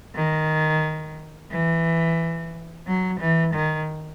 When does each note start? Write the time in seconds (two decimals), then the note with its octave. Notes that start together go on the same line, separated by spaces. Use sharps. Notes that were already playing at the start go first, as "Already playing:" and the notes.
0.16 D#3
1.51 E3
2.87 F#3
3.20 E3
3.54 D#3